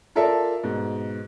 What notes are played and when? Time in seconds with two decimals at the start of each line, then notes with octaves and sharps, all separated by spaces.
0.15 F4 A4 A#4 D5 E5
0.63 G#2 B2